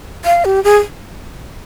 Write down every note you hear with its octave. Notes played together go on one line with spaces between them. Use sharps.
F5
G4
G#4